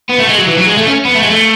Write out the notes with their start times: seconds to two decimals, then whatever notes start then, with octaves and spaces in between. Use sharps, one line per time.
0.09 B3
0.19 A3
0.28 G#3
0.38 F#3
0.48 E3
0.57 F#3
0.67 G#3
0.77 A3
0.86 C#4
1.05 B3
1.15 A3
1.23 G#3
1.30 A3